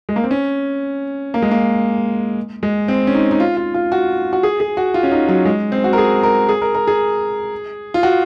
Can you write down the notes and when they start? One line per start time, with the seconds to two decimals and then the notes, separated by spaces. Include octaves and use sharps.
0.09 G#3
0.16 A#3
0.24 C4
0.31 C#4
1.34 A#3
1.42 G#3
1.51 A#3
2.63 G#3
2.88 C4
3.07 C#4
3.14 D#4
3.31 D#4
3.40 F4
3.57 F4
3.74 F4
3.92 F#4
4.33 F#4
4.43 G#4
4.60 G#4
4.77 F#4
4.94 F4
5.03 C#4
5.12 D#4
5.28 F#3
5.45 G#3
5.72 C4
5.84 F#4
5.93 A#4
5.98 G#4
6.23 A#4
6.49 G#4
6.62 A#4
6.75 A#4
6.87 G#4
7.94 F4
8.03 F#4